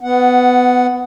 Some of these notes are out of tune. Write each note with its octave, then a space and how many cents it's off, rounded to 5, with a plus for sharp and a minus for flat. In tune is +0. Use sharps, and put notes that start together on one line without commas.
B3 +20 F#5 +0